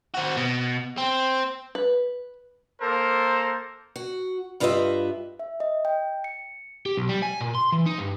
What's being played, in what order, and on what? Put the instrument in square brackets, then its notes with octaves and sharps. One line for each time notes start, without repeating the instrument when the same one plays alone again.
[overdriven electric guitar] C4 F#4
B2
C4
[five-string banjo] B4
[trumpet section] A#3 A4 A#4 C5
[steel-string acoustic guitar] F#4
G2 F4 G4 B4 D#5 E5
[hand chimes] E5
D#5
G5
C#7
[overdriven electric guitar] G4
B1
G3
G#5
A#2
C6
E3
D#4
G2